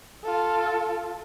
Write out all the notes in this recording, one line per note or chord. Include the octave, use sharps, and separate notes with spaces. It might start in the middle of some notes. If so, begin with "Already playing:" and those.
F4 A4